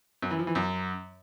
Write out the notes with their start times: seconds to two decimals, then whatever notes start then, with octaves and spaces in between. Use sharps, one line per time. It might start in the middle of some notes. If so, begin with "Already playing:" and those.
0.22 F#2
0.31 E3
0.39 F3
0.47 E3
0.55 F#2